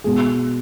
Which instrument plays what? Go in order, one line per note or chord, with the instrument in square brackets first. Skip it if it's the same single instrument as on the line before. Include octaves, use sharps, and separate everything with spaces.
[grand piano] B2 G#3 G#4